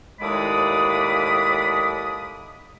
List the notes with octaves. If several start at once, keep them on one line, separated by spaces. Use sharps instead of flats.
D#2 A2 G#3 D5 B5 D#6